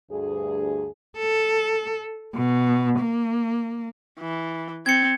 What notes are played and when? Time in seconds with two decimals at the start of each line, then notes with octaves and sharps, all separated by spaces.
0.10 D2 G2 G#4
1.18 A4
2.35 B2
3.00 A#3
4.20 E3
4.86 C4 G#6 C#7